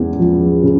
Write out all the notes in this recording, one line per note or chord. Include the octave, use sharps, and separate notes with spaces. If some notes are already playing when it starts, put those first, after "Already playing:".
Already playing: E2 C#3 G#3 E4
F3
C#3